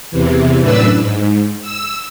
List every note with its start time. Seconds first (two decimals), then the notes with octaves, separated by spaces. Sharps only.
0.11 E2 C3 E3
0.59 F#2 A2 D4 B4 E6
0.98 G#2
1.62 E6